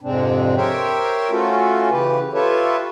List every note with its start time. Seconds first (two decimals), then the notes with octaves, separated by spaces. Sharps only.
0.01 F2 G#2 C3 G#3 C4 D4
0.56 G4 A#4 C5 C#5 E5 G5
1.30 A3 C#4 F4 F#4 A4
1.91 C#3 E3 G4 B4
2.33 F4 G4 A4 B4 C#5 E5